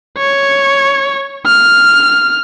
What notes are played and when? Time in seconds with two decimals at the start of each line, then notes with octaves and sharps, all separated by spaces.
0.18 C#5
1.46 F6